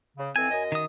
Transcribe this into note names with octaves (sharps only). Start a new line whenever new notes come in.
C#3
F2 E3 C4 G#5
F#2 D#5
D#3 D#6